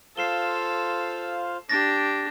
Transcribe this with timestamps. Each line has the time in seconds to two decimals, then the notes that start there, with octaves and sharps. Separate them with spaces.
0.17 F4 A4 C5 F5 C7 E7 G7
1.70 D4 G4 A6 A#6